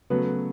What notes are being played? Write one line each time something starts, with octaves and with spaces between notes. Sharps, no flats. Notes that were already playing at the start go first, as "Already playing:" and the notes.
C#3 F#3 A3 B3 B4